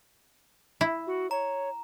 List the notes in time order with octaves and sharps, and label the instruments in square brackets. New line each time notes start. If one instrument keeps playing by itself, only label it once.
[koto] E4
[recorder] F#4
[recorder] C#5 [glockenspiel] A#5